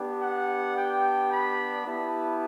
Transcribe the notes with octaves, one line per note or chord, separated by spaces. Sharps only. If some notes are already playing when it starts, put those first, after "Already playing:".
Already playing: B3 D4 G4
F#5
G5
B5
B3 E4 G4 A5